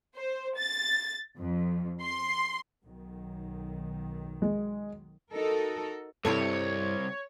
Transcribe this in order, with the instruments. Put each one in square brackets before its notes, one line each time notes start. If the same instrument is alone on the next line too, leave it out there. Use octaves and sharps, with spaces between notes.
[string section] C5
A6
F2
C6
[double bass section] B1 D#3 F#3
[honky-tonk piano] G#3
[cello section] D#4 F#4 A4 A#4
[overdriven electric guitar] C2 [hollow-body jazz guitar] G2 C3 E4 [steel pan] A4 [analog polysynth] C#5